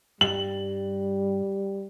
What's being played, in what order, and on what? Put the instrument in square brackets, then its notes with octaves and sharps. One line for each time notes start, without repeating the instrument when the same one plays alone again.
[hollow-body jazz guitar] G2 [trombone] G3 [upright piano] F#7